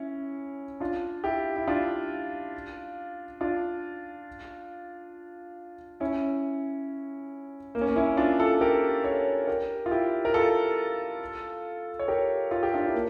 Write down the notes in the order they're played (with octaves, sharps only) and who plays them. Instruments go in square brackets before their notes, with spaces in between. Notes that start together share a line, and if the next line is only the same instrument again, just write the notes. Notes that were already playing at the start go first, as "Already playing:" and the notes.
Already playing: [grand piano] C#4 E4
D4 F4
E4 G4
E4
D4 F4
D4 F4
C#4 E4
A#3
C#4
A#3
C#4 E4
D4 F4
F4 A4
G4 A#4
A4 C#5
G4 A#4
F4
E4 G4
A#4
F4 A4
C#5
G4 A#4
F4
G4
D4 F4
E4
A#3